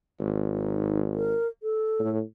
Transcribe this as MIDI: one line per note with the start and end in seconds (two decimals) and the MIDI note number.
0.20 1.34 32
0.50 0.99 63
1.16 1.48 70
1.63 2.11 69
2.00 2.21 45